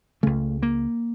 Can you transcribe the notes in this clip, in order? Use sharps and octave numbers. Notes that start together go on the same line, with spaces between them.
C#2 C#3 A3
A#3